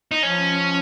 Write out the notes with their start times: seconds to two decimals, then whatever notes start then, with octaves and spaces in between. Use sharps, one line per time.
0.12 D#4
0.23 F3 C#4